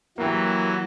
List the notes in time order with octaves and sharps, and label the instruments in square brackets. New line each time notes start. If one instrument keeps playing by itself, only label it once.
[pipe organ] E3 F#3 [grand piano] A#3 G4